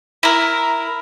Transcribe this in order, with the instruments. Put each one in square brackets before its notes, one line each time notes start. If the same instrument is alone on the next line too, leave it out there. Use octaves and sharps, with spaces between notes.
[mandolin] E4 A#4